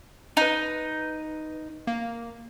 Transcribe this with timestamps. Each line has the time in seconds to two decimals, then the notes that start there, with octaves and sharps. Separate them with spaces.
0.37 D#4 B4 D#7
1.87 A#3